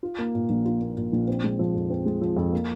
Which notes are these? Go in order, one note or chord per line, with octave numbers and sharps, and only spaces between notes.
F4
A#3
A#2
A#1
F4
A#3
A#2
A#1
C4
G#3
F3
F2
C4
G#3
F3
F2
A#3